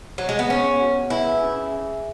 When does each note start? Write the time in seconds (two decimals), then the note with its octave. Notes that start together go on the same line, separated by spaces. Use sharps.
0.18 F#3
0.29 G#3
0.39 B3
0.50 B3 C#4 G#4 C#5
0.80 B3 F#4 C#5 F#5
1.10 E4 G#4 B4 E5 G#5
1.41 C#4 G#4 E5 G#5
1.72 G#4 E5 G#5